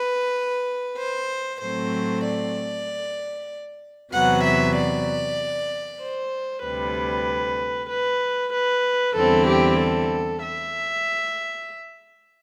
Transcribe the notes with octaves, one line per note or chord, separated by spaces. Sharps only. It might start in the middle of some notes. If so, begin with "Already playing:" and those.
Already playing: B4
C5
A2 F#3 A3 C4 C5
D5
E2 C3 F#3 B3 F#5
E5
D5
C5
D2 C3 G3 B4
B4
B4
E2 D3 G3 C4 E4 A4
G4
A4
E5